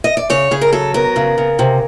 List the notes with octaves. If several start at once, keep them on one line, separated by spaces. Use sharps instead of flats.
D#5
D5
C#3 C#5
C#3 G#4
A#4
F#3 A4
B3 A#4
C#3
C#3
C3